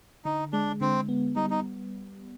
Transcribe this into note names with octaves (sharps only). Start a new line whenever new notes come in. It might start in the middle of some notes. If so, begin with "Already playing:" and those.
D3 D#4
G#3 D4
D3 C4
B3
G3 D#4
D#4